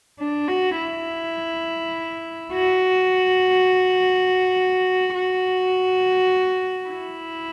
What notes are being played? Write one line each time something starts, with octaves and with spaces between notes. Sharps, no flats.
D4
F#4
E4
F#4
F#4
E4